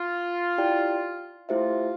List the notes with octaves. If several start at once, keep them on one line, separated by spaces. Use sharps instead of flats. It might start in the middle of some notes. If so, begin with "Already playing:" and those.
Already playing: F4
E4 G4 D5 G5
A3 E4 F4 G4 C5 E5